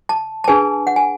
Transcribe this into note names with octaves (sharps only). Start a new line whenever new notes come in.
A5
A5
D4 G#4 B4 G#5
F#5
G#5